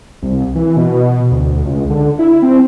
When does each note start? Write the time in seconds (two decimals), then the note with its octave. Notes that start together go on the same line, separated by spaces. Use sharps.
0.22 C2
0.55 E3
0.77 B2
1.31 D2
1.65 C#2
1.90 D3
2.19 E4
2.42 C4